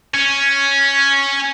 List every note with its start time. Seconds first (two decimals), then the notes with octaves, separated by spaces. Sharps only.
0.14 C#4